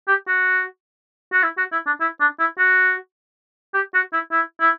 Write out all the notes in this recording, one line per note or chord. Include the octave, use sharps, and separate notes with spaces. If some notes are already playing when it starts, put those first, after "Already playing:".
G4
F#4
F#4
E4
F#4
E4
D4
E4
D4
E4
F#4
G4
F#4
E4
E4
E4